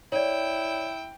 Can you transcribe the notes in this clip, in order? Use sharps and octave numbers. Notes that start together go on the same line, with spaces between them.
E4 C#5 D5 G5